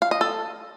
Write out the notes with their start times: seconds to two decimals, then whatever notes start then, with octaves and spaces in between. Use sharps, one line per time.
0.02 F5
0.11 D#5
0.21 A4